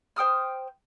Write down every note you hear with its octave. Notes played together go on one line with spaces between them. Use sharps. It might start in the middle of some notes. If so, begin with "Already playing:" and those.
C5 G5 D#6 F6